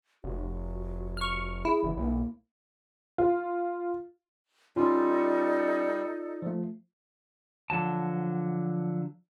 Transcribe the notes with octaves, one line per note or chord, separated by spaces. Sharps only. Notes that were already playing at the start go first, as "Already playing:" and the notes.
F1 F#4
C#6 F6
E4 G#4
F#1 E3
B1 A#3
F4
G3 C#4 D#4 F4 A4 D5 C6
F3 A3
D3 F3 F#3 A5